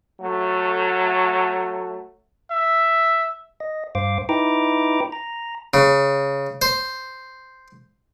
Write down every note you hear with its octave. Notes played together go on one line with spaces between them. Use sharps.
F#3 A3
E5
D#5
G2 C5 F5 D6
D#4 E4 B4 G5 A#5 D6
A#5
C#3
C5